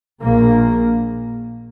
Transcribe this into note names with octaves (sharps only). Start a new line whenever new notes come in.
A#1 A#2 A#3